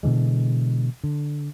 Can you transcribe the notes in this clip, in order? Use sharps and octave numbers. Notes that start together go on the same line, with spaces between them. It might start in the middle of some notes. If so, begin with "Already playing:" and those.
B2 D3 E3 G#3
D3